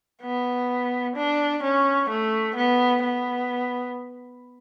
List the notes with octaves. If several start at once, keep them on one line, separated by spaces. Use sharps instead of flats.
B3
D4
C#4
A3
B3
B3